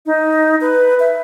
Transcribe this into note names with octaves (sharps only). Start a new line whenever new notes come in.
D#4
B4
E5